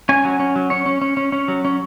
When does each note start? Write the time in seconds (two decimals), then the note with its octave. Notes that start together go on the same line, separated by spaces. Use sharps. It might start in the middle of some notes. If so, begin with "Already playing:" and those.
0.09 C#4 G#5
0.25 F#3
0.40 C#4
0.56 F#3
0.70 C#4 C#5
0.86 C#4
1.02 C#4
1.17 C#4
1.32 C#4
1.48 F#3
1.65 C#4